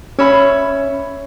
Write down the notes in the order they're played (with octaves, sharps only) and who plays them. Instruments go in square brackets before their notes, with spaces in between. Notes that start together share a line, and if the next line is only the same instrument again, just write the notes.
[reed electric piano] C#4 [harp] C#5 E5 B5